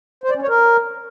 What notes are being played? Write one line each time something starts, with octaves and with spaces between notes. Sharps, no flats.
C5
D5
C#4
C#5
A#4